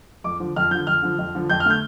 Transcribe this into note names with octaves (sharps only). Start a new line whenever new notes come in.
F2 D6
D3 F3
F2 F6
D3 F3 G6
F2 F6
D3 F3
F2
D3 F3
F2 G6
F6
D3 A3 G6